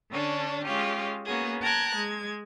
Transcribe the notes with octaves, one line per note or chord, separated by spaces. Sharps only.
D3 C#4 D4 A4
G#3 C#4 F4 G4
A#3 B3 C#4 F#4 G#4
G5 A5 A#5 F#6 G#6
G#3 G#6